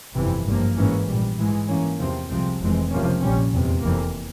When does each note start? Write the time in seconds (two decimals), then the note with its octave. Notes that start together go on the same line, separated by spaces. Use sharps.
0.16 G1 F2 C3 E3
0.47 G#1 G2 F3 A#3
0.77 G#2 E3 A#3 C#4
1.07 A#1 A#2 G3
1.39 G#2 E3 G#3
1.69 G2 E3 A#3 C#4
2.00 E2 C3 F3 C4
2.31 C2 C3 F3 G#3 C4
2.61 F1 F2 E3 G#3 C4
2.91 C#2 C3 F3 A#3 C#4
3.22 A#1 A#2 G3 C#4
3.53 F1 E2 C3
3.83 F1 F2 E3 A#3